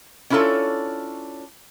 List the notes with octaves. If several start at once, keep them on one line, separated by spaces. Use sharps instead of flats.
C#4 D4 E4 F4 A4 C#5